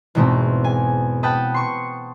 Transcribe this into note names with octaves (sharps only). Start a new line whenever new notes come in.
E2 G#2 B2 A3 C4
G#5
B4 F#5 G5 A5 B5 D#6
C6 C#6 C#7